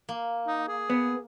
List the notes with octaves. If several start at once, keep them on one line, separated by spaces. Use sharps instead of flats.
A#3
D#4
G#4
B3